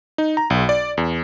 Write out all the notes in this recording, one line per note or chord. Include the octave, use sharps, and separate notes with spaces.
D#4
A#5
B1
D5
E2